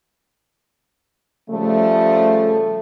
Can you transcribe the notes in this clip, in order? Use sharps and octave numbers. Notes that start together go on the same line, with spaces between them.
C#3 F3 G3 A3